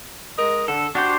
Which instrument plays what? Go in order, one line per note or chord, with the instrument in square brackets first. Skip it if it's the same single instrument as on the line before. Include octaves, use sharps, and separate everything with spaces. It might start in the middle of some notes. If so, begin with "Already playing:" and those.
[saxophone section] G#3 A#4 D#5
[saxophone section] D3 [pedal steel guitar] A4
[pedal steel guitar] D4 G4 C5 [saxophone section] F#4